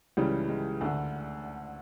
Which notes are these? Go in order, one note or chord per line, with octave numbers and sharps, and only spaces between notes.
C#2 C#3 E3 G3
G#3
D2 D3 A3